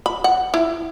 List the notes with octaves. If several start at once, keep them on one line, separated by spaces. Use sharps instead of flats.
B5
F#5
E4